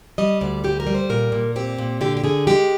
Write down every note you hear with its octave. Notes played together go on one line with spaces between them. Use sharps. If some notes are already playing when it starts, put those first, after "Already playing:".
G3 D#5
D2 D5
G3 G4
A#4
G3
C5
A#2 A#4
A#2
C4 G4
A#2
D3 G4
G4
D3 G#4
G#3 G4